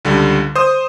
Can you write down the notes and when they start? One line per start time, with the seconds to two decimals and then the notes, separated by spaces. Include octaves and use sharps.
0.05 C#2 D3 G3
0.55 C5 D#6